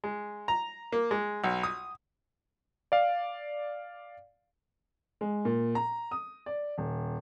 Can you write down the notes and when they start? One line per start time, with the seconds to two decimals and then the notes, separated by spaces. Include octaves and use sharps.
0.04 G#3
0.48 A#5
0.92 A#3
1.11 G#3
1.44 B1
1.63 D#6
2.92 D5 F5
5.21 G#3
5.45 A#2
5.75 A#5
6.11 D#6
6.46 D5
6.78 D#1